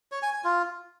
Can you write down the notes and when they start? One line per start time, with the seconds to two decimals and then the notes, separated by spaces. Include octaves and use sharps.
0.12 C#5
0.22 G#5
0.33 G#5
0.44 F4